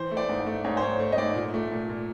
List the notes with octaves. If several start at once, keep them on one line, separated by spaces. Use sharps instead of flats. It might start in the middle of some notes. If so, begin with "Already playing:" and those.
Already playing: E3 C5
A3
D5
G#2
D5
A3
G#2 C#5
C5
G#2 C#5
A3 C#5
D#5
G#2 D5
A#2
A3
A#2
A#2